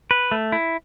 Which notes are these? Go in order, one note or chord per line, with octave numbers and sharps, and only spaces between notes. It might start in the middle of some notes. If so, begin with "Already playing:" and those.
B4
A3
E4